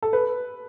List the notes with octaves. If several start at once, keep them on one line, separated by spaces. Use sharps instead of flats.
A4
B4